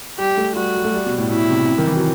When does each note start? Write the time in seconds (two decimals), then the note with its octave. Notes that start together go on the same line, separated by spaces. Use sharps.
0.19 G3 G4
0.37 A3
0.56 G3 F#4
0.75 F#3
0.85 A3
0.94 G3
1.06 B2
1.18 A2
1.31 B2 E4
1.50 C3
1.69 C3
1.78 D#3
1.87 E3
1.96 F#3